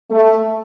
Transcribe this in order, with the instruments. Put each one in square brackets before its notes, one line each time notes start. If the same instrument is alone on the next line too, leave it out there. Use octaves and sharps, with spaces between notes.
[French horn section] A3